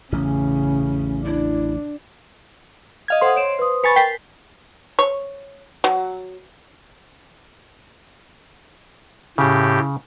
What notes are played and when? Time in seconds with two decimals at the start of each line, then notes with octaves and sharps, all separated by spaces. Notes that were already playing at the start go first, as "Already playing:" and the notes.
0.12 A1 E2 C#3 C#4
1.25 D4 E4
3.08 D#5 F5 G#6
3.21 A4 C5 F#5 C6 D#6
3.35 C#5 D7 E7
3.59 B4 D#6
3.84 B4 G#5 B5 C#6 A6 C#7
3.96 A#4 G5 B6 C7
4.99 C#5
5.84 F#3
9.38 A2 C#3 G4